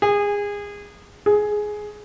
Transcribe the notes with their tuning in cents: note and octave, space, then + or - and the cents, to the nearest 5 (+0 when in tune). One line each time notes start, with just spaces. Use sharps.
G#4 -25
G#4 +10